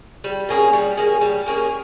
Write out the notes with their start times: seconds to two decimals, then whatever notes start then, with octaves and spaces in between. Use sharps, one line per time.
0.24 G3
0.49 A#3 C#4 G#4
0.73 G3
0.97 A#3 C#4 G#4
1.21 G3
1.46 A#3 C#4 G#4